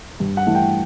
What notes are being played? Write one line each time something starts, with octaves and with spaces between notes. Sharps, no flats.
G2
F#5
E3 A3
G5